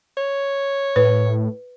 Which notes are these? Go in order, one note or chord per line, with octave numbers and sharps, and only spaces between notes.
C#5
A2 B4